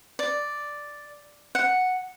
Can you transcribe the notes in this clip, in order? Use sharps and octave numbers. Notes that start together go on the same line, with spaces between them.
D5
F#5